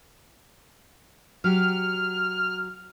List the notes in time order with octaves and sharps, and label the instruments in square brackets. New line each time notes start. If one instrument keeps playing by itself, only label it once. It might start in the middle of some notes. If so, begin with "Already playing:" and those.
[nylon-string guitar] F#3 G4 [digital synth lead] F6